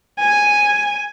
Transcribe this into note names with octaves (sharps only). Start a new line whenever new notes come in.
G#5